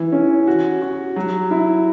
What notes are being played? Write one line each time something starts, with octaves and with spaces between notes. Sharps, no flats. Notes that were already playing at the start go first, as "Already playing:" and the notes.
Already playing: E3
C#4
F#4
F#4
F#3
E4